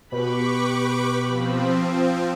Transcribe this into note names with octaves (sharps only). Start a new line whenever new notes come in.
B2 G4 B4 B5 C#6 D6
F3 C4